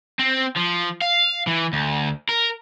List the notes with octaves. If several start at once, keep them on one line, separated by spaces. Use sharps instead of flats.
C4
F3
F5
E3
D2
A#4